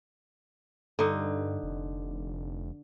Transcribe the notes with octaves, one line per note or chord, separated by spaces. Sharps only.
G2 D3 D#4
F1